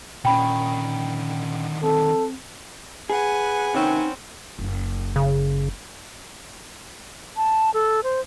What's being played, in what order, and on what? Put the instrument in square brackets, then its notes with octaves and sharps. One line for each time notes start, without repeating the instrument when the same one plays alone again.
[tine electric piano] A#2 C#4 [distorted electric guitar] D3 D#3 [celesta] G5 B5
[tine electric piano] C4 [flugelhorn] A4
[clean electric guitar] G#4 [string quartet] B4 F#5 G#5
[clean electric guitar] D#2 C3 [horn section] C4 C#4 [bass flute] D#4
[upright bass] F#1
[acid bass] C#3
[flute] A5
A4
C5